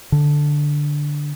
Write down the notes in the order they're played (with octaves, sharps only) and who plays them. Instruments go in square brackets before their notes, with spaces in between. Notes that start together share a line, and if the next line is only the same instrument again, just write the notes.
[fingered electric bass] D3